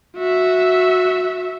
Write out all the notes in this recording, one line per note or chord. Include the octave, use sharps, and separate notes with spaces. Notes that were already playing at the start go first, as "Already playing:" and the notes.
F#4 E5